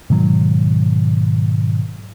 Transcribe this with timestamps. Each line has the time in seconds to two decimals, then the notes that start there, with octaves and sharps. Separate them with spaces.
0.10 G#2 B2 D#3 F#3